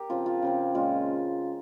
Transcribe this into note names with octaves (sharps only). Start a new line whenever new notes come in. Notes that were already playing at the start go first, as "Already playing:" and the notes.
Already playing: G4 A#4
C#3 F3 C4 F4
F4
C#3 F3 C4
A#2 G#3 C#4 F4